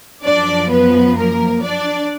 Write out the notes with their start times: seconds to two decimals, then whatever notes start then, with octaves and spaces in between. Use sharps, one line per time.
0.23 F#2 F3 D4 D5
0.69 B3 B4
1.16 A#3 A#4
1.62 D4 D5